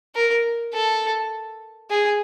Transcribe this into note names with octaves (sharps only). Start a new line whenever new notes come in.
A#4
A4
G#4